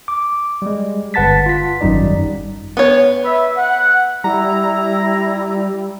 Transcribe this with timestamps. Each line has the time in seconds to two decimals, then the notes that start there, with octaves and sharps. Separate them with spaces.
0.08 D6
0.62 G3 G#3
1.14 G1 B4 F#5 A5 A6 B6
1.46 F4 B6
1.81 G#1 F#2 G3 D#4 D5
2.77 B3 C#5
3.25 B4 E5
3.58 F#5
4.24 G3 E4 A#5